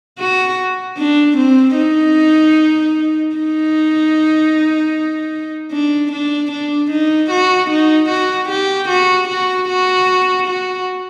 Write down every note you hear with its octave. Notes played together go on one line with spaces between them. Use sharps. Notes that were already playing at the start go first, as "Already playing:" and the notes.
F#4
D4
C4
D#4
D#4
D4
D4
D4
D#4
F#4
D#4
F#4
G4
F#4
F#4
F#4
F#4